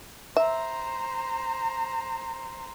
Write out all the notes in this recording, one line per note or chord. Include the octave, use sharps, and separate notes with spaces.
C5 E5 A#5